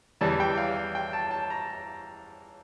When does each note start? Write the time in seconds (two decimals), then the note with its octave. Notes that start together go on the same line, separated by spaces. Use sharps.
0.21 E2 E3 G3 A5
0.40 G5
0.58 F5
0.95 G5
1.13 A5
1.31 A5
1.50 A#5